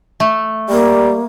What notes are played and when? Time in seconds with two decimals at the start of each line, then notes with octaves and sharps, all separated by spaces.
0.20 A3
0.69 G3 A#3